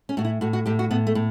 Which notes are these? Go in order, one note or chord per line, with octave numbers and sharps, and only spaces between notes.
C#4
A2 F#4
E4
A2 F#4
F#4
A2 G4
F#4
A2 B3
A3
A2